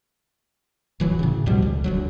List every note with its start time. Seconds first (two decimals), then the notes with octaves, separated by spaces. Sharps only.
1.00 D1 E3 F#3
1.19 A2 C#3
1.46 D2 B2 F3 G3
1.62 C#2
1.84 D#1 D2 F#3